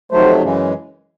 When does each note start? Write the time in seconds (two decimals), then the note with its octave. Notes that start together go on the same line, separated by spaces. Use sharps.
0.12 F2 C3 D#3 F#3 A3 C5
0.43 F#2 C#3 E3 G#3